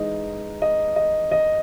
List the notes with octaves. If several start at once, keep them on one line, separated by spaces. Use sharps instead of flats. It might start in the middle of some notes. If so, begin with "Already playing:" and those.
Already playing: E3 G#3 D#4 D#5
D#5
D#5
D#5